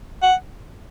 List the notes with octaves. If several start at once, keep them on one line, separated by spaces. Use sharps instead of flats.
F#5